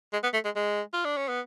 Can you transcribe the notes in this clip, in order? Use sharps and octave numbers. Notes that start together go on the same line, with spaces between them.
G#3
B3
A3
G#3
G#3
F4
D4
C#4
B3